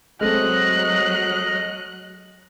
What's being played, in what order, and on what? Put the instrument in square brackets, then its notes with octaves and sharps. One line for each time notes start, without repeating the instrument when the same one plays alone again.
[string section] F#3 [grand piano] G#3 A3 C4 [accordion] D#5 F6 [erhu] F#6